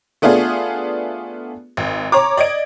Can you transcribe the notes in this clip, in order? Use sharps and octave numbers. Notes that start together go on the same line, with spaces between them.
A3 B3 D4 F4 G#4
G#1
C#5 A#5 D6
D5 D#5 G#6 D7